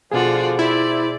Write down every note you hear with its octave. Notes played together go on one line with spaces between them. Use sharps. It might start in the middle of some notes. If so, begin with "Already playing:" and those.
B2 D3 F3 F4 F#4 G#4 D5
E4 C5 D5